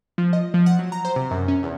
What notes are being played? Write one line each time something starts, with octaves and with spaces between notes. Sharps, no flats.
F3
D#5
F3
F#5
F#3
A#5
C5
C3
F#2
C#4
E2